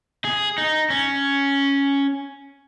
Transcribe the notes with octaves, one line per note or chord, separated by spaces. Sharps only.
G#4
D#4
C#4